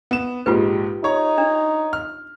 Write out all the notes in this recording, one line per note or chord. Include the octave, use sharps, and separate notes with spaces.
B3 E7
A#1 G#2 F4 G4 B4
D#4 C#5 A#5
D4
F6